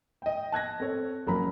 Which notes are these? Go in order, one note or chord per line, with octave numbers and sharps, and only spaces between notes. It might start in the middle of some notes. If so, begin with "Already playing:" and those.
D#5 G5
A5 F#6 G#6 A#6
C4 A4 C#5
F#1 F#3 A#3 A#5 B5